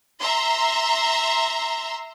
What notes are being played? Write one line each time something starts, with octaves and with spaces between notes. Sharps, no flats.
E5 A#5 C6